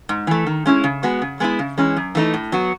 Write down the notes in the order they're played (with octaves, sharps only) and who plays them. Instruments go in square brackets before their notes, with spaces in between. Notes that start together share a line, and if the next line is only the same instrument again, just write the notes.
[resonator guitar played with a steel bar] G#2
E3 A3
D#3
G#3 C#4 E4
C#3
G#3 B3 F#4
C#3
G#3 B3 E4
C#3
E3 G#3 C#4 E4
F#2
E3 A3 D#4
A2
F#3 B3 F#4